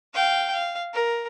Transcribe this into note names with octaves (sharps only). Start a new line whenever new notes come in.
F5 G5
F5
A#4